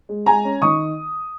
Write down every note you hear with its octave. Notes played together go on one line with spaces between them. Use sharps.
G#3
G#3 G#5 A#5
C#4
D#3 C#6 D#6